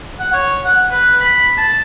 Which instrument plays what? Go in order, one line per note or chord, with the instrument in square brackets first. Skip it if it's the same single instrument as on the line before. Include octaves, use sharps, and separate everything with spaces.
[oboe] F#5
C#5
F#5
B4
B5
A5